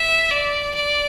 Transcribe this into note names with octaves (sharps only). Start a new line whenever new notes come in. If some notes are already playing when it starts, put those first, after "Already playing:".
Already playing: E5
D5
D5